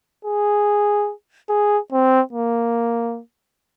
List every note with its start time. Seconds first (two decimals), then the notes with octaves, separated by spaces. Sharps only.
0.25 G#4
1.49 G#4
1.92 C4
2.33 A#3